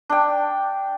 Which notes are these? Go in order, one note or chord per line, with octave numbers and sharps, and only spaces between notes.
D4 G5